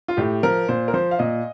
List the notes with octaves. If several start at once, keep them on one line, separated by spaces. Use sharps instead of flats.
F4
A2 G4
F3 A#4
A#2 C5
A#4
F3 C5
F5
A#2 D#5